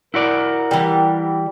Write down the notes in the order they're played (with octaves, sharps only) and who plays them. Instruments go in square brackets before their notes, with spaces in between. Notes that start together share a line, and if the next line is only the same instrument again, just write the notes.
[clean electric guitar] E4 F#4 D5 [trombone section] A#4
[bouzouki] E3 G3